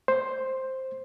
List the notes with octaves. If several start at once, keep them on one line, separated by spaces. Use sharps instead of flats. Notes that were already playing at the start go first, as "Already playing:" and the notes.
C5